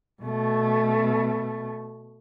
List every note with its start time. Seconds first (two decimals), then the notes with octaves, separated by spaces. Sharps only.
0.22 B2 A3